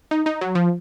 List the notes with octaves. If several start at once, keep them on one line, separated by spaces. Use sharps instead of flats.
D#4
D#4
F#3
F3